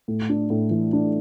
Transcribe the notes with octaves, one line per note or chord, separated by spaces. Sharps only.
A2
D4
A2
E3
D4